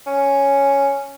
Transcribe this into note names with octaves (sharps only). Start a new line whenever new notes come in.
C#4